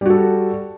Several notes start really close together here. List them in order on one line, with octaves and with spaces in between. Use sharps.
G3 F#4 A4